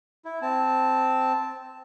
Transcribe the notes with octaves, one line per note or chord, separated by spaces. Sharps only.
E4
C4 A5